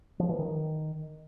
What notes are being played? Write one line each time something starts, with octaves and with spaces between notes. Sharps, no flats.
F3
E3
D#3